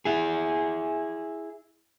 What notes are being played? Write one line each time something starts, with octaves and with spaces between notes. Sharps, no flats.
E4 G#4